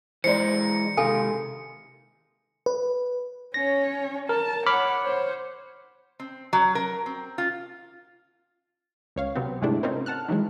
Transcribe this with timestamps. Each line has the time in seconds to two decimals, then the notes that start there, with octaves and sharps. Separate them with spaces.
0.24 E3 G#3 D#4 C5 D5 C#7
0.97 C3 D#3 G#3 A4 F5 G#5
2.66 B4
3.54 C#4 C#5 A#6
4.29 A#4 A5
4.66 C#5 F#5 B5 D6 F6
5.02 C5 C#5
6.20 C4
6.53 F#3
6.75 A#4
7.06 C4
7.38 F4
9.16 C#2 C#5 F5
9.35 C3 F#3 B3 C4
9.62 G#2 C3 G#3 A3 D4 E4
9.83 C4 C#4 D#4 F4 A#4 C5
10.06 F#5 A5 F6 F#6
10.28 D#3 E3 F#3 G#3